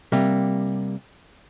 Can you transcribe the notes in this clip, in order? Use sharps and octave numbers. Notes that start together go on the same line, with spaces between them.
C3 G3 A#3